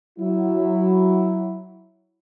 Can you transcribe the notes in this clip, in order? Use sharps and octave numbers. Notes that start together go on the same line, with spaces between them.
F#3 E4